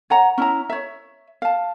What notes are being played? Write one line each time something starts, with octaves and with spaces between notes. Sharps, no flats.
C#5 F#5 A#5
C#4 E4 A#5
C#5 E5
F5 A5